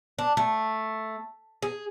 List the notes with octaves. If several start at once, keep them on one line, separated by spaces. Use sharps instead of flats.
D4
A3
G#4